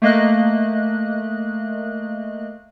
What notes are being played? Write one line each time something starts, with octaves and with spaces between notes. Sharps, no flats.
A3 A#3 D#5 F#6